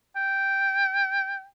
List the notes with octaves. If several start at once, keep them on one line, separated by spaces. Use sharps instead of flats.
G5